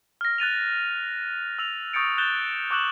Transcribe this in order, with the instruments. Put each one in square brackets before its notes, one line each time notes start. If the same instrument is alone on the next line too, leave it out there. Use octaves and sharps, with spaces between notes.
[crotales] F6 A#6
F#6 A6 D#7 F7
E6 F7
C#6 D#6 G6 A6 C#7 D7
F#6 G6 A6 E7 G7
C#6 D6 E6 F#6 E7 F#7